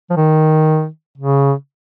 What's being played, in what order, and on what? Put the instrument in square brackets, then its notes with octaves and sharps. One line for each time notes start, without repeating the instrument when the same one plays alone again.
[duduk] F3
D#3
C#3